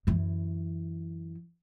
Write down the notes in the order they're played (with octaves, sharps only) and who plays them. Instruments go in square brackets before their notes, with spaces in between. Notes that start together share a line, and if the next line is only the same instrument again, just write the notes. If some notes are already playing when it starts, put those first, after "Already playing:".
[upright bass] F#2 E3